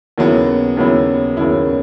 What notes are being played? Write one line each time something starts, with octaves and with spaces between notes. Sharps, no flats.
D#2 C#3 F#3 B3 E4
D#2 C#3 F#3 B3 E4
D#2 C#3 F#3 B3 E4